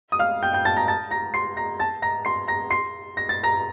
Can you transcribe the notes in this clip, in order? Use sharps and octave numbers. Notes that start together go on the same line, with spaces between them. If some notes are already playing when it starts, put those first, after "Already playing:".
D#6
F5 F6
G5 G6
G5 G6
A5 A6
A#5 A#6
A5 A6
A#5 A#6
C6 C7
A#5 A#6
A5 A6
A#5 A#6
C6 C7
A#5 A#6
C6 C7
A#6
A6
A#5 A#6